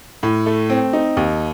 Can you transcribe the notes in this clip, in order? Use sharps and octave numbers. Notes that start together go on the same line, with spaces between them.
A2
A3
C4
D#4
D#2